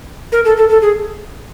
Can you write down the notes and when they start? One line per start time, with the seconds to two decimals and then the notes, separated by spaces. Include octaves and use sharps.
0.32 A#4
0.45 A4
0.57 A4
0.69 A4
0.82 G#4